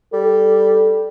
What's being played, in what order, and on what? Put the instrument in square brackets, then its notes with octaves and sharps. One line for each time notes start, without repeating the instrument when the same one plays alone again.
[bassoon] G3 [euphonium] A4